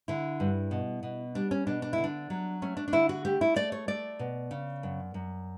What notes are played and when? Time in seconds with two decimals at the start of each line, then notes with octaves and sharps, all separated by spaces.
0.08 D3 E4
0.40 G2
0.71 B2
1.03 B2
1.35 G3 D4
1.51 C#4
1.67 B2 D4
1.82 D4
1.93 E4
1.98 D3
2.04 D4
2.30 F#3
2.62 A3 C#4
2.77 D4
2.88 D4
2.92 D3 E4
3.09 F#4
3.25 A3 G4
3.41 E4
3.56 A3 D5
3.72 C#5
3.88 A3 D5
4.19 B2
4.51 C#3
4.83 F#2
5.14 F#2